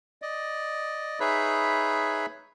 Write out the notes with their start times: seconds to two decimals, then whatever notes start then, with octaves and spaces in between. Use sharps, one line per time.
0.22 D5 D#5
1.20 D#4 G#4 B4 C#5 E5 B5